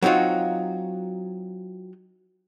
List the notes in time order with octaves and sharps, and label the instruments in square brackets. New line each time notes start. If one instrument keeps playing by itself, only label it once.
[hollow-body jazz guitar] F#3 C4 D#4 F4 F#4